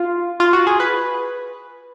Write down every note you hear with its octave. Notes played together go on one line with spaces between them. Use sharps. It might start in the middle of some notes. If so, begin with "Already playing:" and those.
Already playing: F4
F4
F#4
G#4
B4